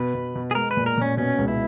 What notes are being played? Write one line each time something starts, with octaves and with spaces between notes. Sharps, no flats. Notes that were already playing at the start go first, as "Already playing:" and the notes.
Already playing: B2 B4
B2
B2
G#4
G#3 A#4
B4
A#2
A#4
A#2 C#4
B2 C#4
C#2
E4